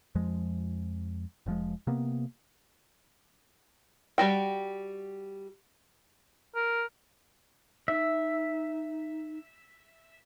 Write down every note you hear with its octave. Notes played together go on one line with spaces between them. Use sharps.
F2 F3 G#3
F1 F3 G#3
C3 A#3 B3
G3 F#4 G5
A#4
D#4 E5